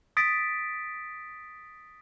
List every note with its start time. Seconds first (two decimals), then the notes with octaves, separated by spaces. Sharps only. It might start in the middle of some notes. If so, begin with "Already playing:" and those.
0.17 D#6 A6 B6 D7